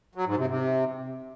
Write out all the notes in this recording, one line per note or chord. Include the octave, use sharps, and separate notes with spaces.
F#3
G#2
C3
C3